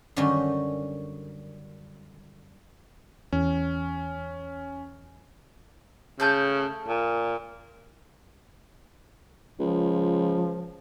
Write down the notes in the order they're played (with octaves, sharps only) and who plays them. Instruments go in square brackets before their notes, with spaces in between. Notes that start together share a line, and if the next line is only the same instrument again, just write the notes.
[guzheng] F#2 D3 D#3 G3 C#4
[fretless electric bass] E2 [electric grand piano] C#4
[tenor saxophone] C#3 [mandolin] A3 A5 G6
[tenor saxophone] A#2
[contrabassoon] C#2 [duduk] F3